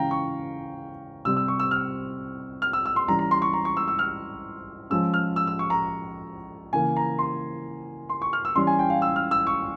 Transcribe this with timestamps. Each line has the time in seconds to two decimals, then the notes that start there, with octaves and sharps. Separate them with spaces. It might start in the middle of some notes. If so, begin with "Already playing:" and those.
Already playing: C#3 E3 G#3 C#4 F5 G5 A#5
0.11 C#6
1.25 C3 G3 C4 E6
1.37 E6
1.48 C#6
1.59 E6
1.71 F6
2.62 F6
2.73 E6
2.86 E6
2.96 C6
3.08 E3 G3 C#4 A#5
3.19 A#5
3.31 C6
3.42 C#6
3.53 A#5
3.65 C#6
3.77 E6
3.88 E6
3.99 F6
4.90 F3 G#3 C#4 E6
5.14 F6
5.36 E6
5.47 E6
5.59 C#6
5.70 A#5
6.73 C#3 E3 A#3 G#5
6.96 A#5
7.19 C6
8.09 C6
8.22 C#6
8.33 F6
8.45 E6
8.55 E3 G3 C#4 C6
8.67 G#5
8.79 G5
8.90 F5
9.02 E6
9.16 F6
9.31 E6
9.47 C#6